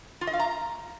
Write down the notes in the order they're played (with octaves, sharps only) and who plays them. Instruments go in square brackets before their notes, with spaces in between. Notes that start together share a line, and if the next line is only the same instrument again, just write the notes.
[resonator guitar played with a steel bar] F4
D#5
F5
A#5